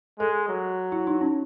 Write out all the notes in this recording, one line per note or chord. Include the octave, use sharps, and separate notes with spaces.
G#3 A4
F#3
E4
D#4
C#4